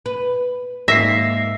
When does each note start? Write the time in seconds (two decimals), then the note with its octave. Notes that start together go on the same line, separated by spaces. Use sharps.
0.06 B4
0.88 G#2 A#3 E5 A#6 C7